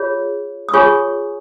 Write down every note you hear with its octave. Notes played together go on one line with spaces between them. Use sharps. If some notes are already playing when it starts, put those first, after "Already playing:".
Already playing: F4 G#4 C#5
D#6
F4 G#4 C#5 G#5 C#6